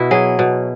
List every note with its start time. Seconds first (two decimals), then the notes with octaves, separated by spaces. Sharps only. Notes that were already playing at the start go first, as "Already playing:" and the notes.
Already playing: B2 E4 F#4
0.11 F#3 G#4
0.39 B2